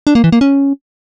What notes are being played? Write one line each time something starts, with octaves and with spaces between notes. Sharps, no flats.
D4
A#3
E3
A#3
C#4